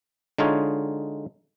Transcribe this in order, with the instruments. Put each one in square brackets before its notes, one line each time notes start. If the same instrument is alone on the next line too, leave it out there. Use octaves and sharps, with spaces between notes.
[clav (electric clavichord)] D3 G#3 D#4 F4 C#5